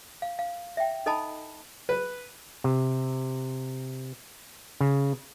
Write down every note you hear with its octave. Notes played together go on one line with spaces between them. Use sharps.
F5
F5
E5 G5
D#4 A4 D#5 G#5 A5 B5
B4
C3
C#3